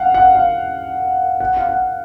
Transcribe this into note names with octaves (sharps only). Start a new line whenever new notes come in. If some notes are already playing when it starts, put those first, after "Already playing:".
Already playing: F5 F#5
F#5
F5
F#5
F5
F#5